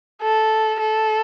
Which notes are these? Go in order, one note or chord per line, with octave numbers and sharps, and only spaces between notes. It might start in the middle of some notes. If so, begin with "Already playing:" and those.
A4
A4